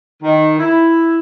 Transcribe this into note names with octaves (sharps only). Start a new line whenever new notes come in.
D#3
E4